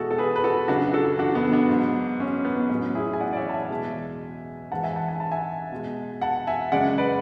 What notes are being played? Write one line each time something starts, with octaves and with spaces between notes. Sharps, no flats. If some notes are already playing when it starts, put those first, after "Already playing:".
Already playing: B2 G#3 E4 F#4 G#4 A4
A4
G#4 B4
B4
F#4 A4
F#2 C#3 F#3 D4 F#4
F#4 A4
D4 F#4
B3 D4
B3 D4
G#2 F#3
C#4
B3
A2 F#3 C#4
E4 G#4
G#5
D5 F#5
D5
C#5 E5
A5
E5 G#5
E2 B2 G#3
G#2 E3 G#3 F#5 A5
E5 G#5
F#5 A5
G#5
A5
E5 G#5
B2 G#3
F#5 A5
E5 G#5
F#2 C#3 G#3 D5 F#5
B4 D5